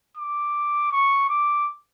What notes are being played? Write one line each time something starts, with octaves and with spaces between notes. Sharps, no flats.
D6
C#6
D6